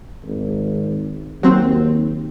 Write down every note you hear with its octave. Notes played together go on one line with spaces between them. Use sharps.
G#1
D#2 F#3 C4